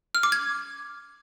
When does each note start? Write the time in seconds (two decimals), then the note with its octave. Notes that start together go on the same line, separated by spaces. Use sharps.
0.15 F6
0.23 D6
0.32 G#6